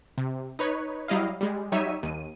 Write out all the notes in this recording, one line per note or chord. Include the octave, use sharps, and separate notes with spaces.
C3
D#4 B4 C#5
F#3 G3 E4 D#5 F5
G3 G#3
F#3 G3 D#4 C#5 E5 D#7
D#2 D#7